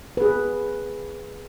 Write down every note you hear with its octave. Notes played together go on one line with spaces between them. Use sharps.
G#4 B4